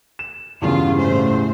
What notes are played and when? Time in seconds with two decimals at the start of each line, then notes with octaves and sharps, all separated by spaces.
0.19 E7
0.62 E2 G2 C#3 F4
0.97 A2 A3 C5